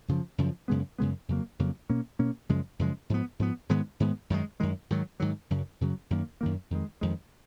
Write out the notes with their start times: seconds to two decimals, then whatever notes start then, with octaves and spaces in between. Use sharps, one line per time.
0.08 F#2 C#3 F3
0.38 F#2 C#3 F3
0.68 F#2 C#3 G#3 B3
0.98 F#2 C#3 G#3 B3
1.28 F2 C#3 F#3 A#3
1.59 F2 C#3 F#3 A#3
1.89 B2 A#3 C#4
2.19 B2 A#3 C#4
2.49 F#2 C#3 F3 G#3
2.79 F#2 C#3 F3 G#3
3.10 G#2 F3 B3
3.39 G#2 F3 B3
3.69 G#2 D#3 G#3 B3
4.00 G#2 D#3 G#3 B3
4.30 F#2 D#3 G#3
4.60 F#2 D#3 G#3
4.90 G#2 D#3 F#3
5.20 G#2 D#3 F#3
5.50 F#2 C#3 F#3
5.81 F#2 C#3 F#3
6.10 F#2 D#3 A#3
6.41 F#2 D#3 A#3
6.70 F2 D#3 G#3
7.01 F2 D#3 G#3